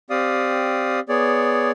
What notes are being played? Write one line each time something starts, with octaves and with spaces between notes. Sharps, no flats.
C4 G4 D5 F5 D#6
B3 G#4 C#5 D5